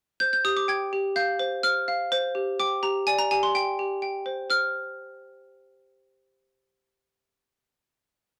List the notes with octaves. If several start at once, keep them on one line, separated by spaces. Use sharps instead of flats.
C5 G6
G6
G4 D#6
D6
G5 G#6
G4
F5 G6
C5
C5 F6
F5
C5
G4
G5 D6
G4 A#5
D5 G#5
A#5
G4 G#5
C6
G5
G4
G5
C5
C5 F6